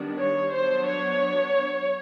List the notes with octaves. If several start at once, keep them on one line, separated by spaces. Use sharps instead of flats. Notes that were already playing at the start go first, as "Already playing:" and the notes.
Already playing: D#3 G3 B3 D4
C#5
F#3 B3 D4 C5
C#5